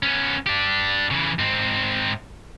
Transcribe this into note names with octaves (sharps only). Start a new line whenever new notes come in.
B3 C#4
D4 G4
C#3 E3
G#2 C4